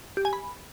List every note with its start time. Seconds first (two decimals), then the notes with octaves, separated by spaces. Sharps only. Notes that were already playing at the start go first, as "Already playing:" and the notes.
0.17 G4
0.25 G#5
0.33 B5